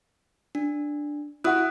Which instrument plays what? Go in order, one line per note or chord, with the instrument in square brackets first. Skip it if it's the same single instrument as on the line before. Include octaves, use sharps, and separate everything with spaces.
[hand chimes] D4
[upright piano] E4 F#4 [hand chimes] D#6 F#6